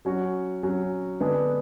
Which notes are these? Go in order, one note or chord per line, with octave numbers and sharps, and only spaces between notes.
F#3 C#4 F#4
F#3 C#4 F#4
D3 G#3 B3 D4 G#4